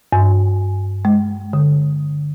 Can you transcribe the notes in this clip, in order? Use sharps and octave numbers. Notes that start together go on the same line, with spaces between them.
G2
G#3
D3